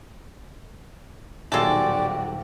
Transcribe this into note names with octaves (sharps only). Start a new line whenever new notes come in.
D#1 B1 G#3 F#4 G4 A4 D5